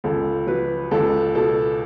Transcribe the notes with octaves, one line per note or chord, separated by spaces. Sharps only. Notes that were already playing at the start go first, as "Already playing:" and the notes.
C#2 A4
F#3 B4
C#2 A4
B2 A4